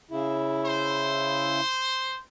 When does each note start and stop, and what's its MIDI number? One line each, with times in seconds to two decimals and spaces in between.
0.11 1.60 49
0.11 1.60 64
0.65 2.19 72